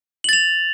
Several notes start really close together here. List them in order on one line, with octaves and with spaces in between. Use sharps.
F#7 A6 F7